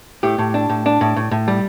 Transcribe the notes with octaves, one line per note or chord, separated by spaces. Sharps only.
A2 G4
A2
D4
A2
D4
A2
A2
A2
G3